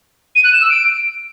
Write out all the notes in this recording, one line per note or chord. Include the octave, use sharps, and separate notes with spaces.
D#7
F#6
E7
E6
D7